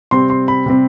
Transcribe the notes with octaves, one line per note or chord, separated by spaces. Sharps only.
C3 G3 C4 C6
C6
B5
C3 G3 C4